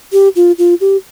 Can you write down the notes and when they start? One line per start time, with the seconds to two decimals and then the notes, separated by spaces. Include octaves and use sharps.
0.12 G4
0.36 F4
0.58 F4
0.81 G4